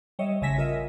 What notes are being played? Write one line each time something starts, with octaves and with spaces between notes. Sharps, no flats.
G3 C#5 D#5 E5
A1 C#3 E5 G#5 A#6 B6
F4 A#4 D#5 E5